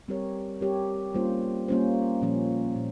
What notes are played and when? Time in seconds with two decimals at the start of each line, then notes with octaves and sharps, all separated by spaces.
0.08 G3 C4 G4 A#4 C#5
0.61 G3 C4 G4 A#4 C#5
1.14 G3 A#3 C#4 F4 C5
1.68 G3 A#3 C#4 F4 C5
2.22 A#2 F3 A#3 C#4
2.76 A#2